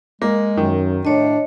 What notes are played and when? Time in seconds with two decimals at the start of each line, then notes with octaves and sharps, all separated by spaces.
0.22 G#3 A#3
0.57 F#2 D#3
1.05 A2 D4 C#5 D#5